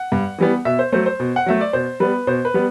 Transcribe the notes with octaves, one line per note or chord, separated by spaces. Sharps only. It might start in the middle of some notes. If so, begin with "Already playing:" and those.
Already playing: F#5
G2
E3 G3 B3
B2 E5
C5
F#3 A3 C5
C5
B2
F#5
F#3 A3 E5
D5
B2 C5
G3 B3 B4
B2 C5
B4
G3 B3